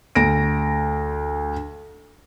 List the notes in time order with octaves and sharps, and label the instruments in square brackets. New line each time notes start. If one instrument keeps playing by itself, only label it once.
[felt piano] D2 A#6 D7